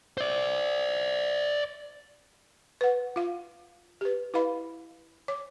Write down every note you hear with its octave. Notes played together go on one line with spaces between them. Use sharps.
C5 D5
B4 F#5
F4 F5
G4 B4
E4 B4 D#5 F5 B5
C#5 D6